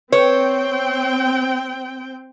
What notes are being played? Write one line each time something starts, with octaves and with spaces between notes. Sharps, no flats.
C4 B4 C#5 G5 C#7